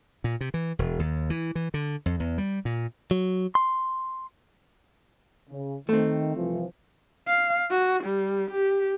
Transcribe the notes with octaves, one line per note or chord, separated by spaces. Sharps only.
A#2
C3
E3
E1
D#2
E3
E3
D3
F2
E2
G3
A#2
F#3
C6
C#3
D#3 A3 C4
C2 E3 F3
F5
F#4
G3
G4